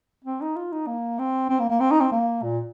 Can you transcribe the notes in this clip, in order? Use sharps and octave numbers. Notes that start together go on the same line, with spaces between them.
C4
D#4
F4
D#4
A#3
C4
C4
A#3
A#3
C4
D#4
C4
A#3
A#2